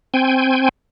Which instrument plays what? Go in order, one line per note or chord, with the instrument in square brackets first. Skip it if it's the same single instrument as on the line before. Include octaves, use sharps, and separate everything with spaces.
[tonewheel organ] C4 G5 G#5